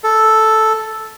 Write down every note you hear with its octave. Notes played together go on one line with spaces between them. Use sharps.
A4